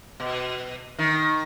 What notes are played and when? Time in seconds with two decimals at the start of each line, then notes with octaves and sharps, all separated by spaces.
0.20 B2
0.99 D#3